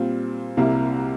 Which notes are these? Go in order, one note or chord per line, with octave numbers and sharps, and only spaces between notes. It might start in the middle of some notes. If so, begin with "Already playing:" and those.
Already playing: A#2 G3 C4 F4
C2 C3 G3 A#3 E4